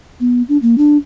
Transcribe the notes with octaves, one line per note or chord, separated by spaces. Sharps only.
B3
D4
A#3
D4